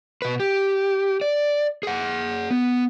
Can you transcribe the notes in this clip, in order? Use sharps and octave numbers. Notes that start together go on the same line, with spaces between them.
B2 B4
G4
D5
G#4 F#5
B3